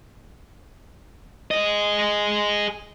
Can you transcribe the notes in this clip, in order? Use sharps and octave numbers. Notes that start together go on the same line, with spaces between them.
G#4 D#5